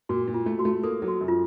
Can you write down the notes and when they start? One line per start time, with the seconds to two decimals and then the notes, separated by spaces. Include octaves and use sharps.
0.09 A#2 F#4
0.28 A#2
0.34 F4
0.46 A3
0.59 F#4
0.65 A3
0.83 A#3 A4
1.02 F#3
1.08 F#4
1.21 F#2
1.28 F4